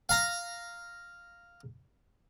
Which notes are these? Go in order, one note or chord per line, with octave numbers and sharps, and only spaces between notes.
F5 A#5